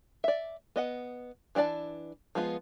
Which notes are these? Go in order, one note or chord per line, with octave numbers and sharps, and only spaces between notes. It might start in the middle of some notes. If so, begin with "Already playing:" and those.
D5 E5
B3 D#5 F#5
E3 D4 G#4 D5 A5
F3 G#3 B3 E4 F4